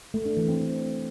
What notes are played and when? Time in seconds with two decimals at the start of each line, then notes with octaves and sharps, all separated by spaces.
0.14 A3
0.25 D4
0.37 E3
0.48 C4